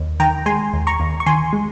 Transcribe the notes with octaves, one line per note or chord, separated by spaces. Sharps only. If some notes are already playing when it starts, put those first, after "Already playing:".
Already playing: D#2
D#3 G5 A#5
G#3 G#5 C6
D#2
A#5 C#6
D#2
C#6
D#3 G#5 C6
G#3